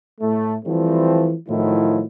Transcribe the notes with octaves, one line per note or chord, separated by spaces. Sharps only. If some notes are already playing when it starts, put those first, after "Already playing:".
A2 A3
E3 F3 G3 A3 C4
A2 D#3 F3 F#3 E4